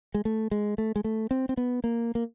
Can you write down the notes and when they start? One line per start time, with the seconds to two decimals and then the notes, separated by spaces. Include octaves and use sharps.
0.14 G#3
0.25 A3
0.51 G#3
0.78 A3
0.96 G#3
1.04 A3
1.31 C4
1.49 C4
1.57 B3
1.84 A#3
2.15 A#3